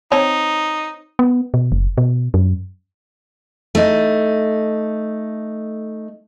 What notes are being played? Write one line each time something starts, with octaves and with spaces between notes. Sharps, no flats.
C4 D#4 C#5 A5
B3
B2
F#1
B2
F#2
A3 D#4